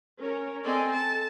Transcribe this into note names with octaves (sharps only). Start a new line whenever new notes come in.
C#4 A#4 C#5
C4 A4 D5 D#5 G#5
A4 A5